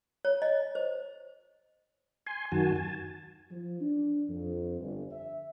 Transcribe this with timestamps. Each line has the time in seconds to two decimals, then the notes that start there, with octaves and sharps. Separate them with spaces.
0.25 C#5
0.42 D#5
0.75 C5
2.27 G#5 C6
2.52 F#2 D#3 F#4 G#5 A5
2.76 G#5 A5
3.51 F3
3.81 D4
4.28 F2
4.81 G1
5.11 E5